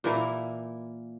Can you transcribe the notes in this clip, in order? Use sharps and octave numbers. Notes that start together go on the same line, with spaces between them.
A#2 E3 A#3 E4